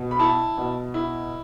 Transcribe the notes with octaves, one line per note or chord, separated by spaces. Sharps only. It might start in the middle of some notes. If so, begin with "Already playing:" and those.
Already playing: B2
B5
E4 A5
B2
E4